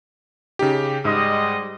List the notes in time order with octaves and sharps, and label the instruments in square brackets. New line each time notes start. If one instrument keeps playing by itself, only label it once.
[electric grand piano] C#3 D#4 G4
[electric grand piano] G#2 [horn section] G3 G#3 D#5